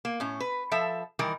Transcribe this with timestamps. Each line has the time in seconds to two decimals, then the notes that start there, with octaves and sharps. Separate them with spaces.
0.05 A#3
0.20 A2 C#4
0.40 B4
0.71 F3 A4 E5
1.19 D#3 E3 G3 A#4